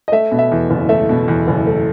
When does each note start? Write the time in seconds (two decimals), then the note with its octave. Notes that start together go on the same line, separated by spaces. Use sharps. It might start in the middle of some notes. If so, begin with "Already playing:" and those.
0.08 D#5
0.12 A3 E5
0.32 B2
0.39 E5
0.51 E2
0.70 F#1
0.89 A3 E5
1.09 B2
1.28 E2
1.47 F#1
1.67 A3